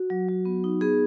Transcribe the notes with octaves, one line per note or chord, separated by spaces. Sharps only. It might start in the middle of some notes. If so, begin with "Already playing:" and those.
Already playing: F#4
F#3
F#3
B3
D#4
B3 G#4